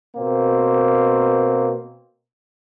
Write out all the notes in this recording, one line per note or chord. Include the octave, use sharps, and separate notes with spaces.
B2 A#3 C4